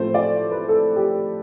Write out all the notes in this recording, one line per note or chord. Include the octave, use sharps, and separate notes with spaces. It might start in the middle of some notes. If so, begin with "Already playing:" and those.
Already playing: A2 F3 A3 C4 C5
D5
B4
A4
G4